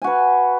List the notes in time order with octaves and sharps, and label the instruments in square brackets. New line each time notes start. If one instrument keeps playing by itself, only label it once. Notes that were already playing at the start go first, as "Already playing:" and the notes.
[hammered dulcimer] G#5
F#4
B4